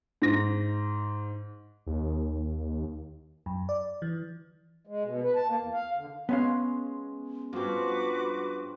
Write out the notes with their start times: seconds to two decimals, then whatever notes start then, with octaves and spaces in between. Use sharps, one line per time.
0.22 G#2 A#6
1.86 D#2
3.46 F#2
3.69 D5
4.02 E3
4.87 G#3
5.04 B2
5.23 B4
5.36 A5
5.48 A#3
5.60 E2
5.72 F5
5.97 D3
6.29 G#3 B3 C#4 F5
7.53 G2 F3 G3 C4 F#4 B4 D6